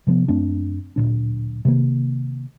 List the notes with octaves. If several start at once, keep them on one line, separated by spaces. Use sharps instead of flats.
C3 F3 G#3 B3
F#2 A3 C4 D4
D1 A#1 A#2 D4
C3 D#3 F#3 A#3